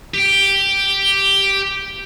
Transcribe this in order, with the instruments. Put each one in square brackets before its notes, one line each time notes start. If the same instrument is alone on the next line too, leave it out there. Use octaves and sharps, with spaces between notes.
[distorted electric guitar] G4 G5